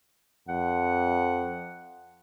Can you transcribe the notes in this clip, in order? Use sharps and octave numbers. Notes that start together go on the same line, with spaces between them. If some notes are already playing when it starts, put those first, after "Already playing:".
F2 F#5